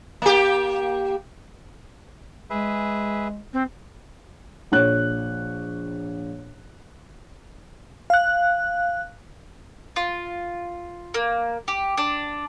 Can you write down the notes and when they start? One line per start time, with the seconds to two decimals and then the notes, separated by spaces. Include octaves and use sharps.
0.22 A#3 G4
2.50 G#3 G#4 B4 E5
3.53 C4
4.72 A#1 C#5 F#6
8.10 F5 F#6
9.96 F4
11.14 A#3
11.68 G4
11.97 D4